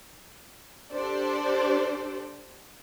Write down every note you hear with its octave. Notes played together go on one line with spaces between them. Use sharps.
D4 G4 A4 C5 D5